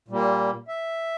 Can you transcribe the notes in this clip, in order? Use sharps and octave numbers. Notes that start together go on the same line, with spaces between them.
A#2 G3 A#3
E5